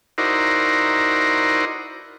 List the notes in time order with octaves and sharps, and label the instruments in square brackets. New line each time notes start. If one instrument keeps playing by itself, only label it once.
[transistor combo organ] D#4 E4 F#4 A#4 C5 D5